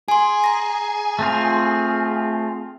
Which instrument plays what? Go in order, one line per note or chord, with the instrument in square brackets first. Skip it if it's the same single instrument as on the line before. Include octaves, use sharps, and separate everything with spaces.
[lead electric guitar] G#4 [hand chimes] G#5 C6
[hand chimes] A#5 A#6
[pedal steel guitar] A3 C4 F4